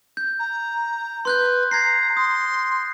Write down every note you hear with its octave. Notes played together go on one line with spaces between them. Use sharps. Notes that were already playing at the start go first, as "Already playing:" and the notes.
G6
A#5
B4 C6 F#6 G6
A#5 G#6 A#6 C7
C6 D#6